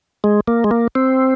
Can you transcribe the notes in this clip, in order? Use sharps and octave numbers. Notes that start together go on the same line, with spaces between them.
G#3
A#3
G#3
A#3
C4